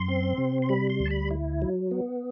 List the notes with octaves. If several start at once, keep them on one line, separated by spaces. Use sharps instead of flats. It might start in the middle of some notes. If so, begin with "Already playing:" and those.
Already playing: F#2 C6
C4
C3
C6
G3 B5
C6
D2
A5
B5
E4
F#3
B3